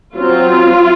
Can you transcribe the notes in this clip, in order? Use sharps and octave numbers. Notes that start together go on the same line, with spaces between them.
F#3 C4 F4